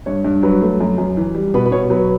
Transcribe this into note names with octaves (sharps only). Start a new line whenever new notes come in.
G2 C#5
G2
F#3 B4
A3
F#2
F#2
E3
G3
B2 B4
B4
B2 C#5
F#3 B4